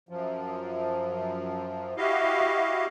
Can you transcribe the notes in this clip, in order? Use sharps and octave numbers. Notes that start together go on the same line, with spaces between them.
F#2 F3
E4 F#4 G4 D#5 F5